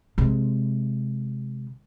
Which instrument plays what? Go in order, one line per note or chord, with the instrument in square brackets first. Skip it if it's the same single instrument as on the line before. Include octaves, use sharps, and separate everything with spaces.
[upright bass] C3 G#3